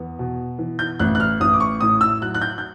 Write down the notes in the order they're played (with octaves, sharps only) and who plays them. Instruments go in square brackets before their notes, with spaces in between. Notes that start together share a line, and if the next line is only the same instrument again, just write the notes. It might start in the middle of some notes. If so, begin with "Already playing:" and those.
Already playing: [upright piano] E2 B3
B2
E3
G6
A1 F#6
F#6
F6
A1 D#6
D6
C#6
A2 D#6
E6
F#3 F#6
F#6
G6
G6